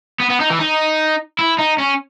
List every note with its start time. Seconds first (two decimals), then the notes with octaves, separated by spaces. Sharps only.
0.20 B3
0.30 B3
0.41 D#4
0.51 E3
0.59 D#4
1.39 E4
1.58 D#4
1.78 C#4